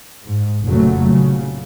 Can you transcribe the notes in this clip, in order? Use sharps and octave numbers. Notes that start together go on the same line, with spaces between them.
G#2
F1 A#2 C#3 F#3 A3
C#3